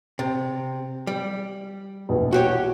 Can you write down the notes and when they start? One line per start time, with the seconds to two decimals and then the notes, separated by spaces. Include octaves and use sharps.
0.19 C3
1.07 G3
2.09 A#1 E2 B2
2.33 F#4 G4 C#5